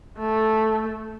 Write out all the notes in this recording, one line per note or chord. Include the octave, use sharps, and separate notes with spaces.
A3